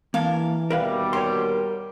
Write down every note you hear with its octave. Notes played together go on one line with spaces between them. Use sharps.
E3 A#3 A4 A#4 F5
D#2 B2 G3 A#4 B4 E5 F5
G4 A#4 C#5 C6